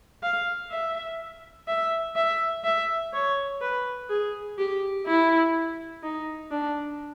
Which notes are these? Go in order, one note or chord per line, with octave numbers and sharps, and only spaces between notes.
F5
E5
E5
E5
E5
C#5
B4
G#4
G4
E4
D#4
D4